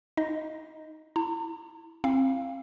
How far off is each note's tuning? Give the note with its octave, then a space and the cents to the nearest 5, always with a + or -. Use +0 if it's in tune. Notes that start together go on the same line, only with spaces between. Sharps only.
D#4 +5 D#5 +0
E4 +0 A#5 -40
C4 +25 E4 +0 F5 -10